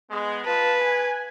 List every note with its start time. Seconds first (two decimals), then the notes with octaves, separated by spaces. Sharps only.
0.11 G#3 B3
0.45 F4 B4 A5
0.80 G#5